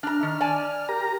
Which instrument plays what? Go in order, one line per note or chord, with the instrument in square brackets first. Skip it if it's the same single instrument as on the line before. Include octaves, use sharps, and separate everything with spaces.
[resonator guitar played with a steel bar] D4 A#5 [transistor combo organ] F6
[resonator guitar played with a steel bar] D#3
D5 G#5 A5
[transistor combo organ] G4 A#4 A#5